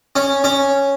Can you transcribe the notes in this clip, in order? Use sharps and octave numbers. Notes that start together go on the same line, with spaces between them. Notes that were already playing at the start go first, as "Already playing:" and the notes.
C#4
C#4